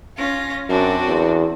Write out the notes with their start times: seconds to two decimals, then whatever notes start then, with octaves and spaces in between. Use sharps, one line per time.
0.17 C#4 F4 A#6
0.69 F#2 C4 D4 F#4
1.08 E2